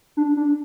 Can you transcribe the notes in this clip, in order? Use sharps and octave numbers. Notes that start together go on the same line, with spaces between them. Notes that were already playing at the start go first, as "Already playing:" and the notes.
D4
D4